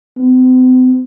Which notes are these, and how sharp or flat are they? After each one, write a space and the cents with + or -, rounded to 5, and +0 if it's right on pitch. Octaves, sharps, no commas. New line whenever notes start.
C4 -45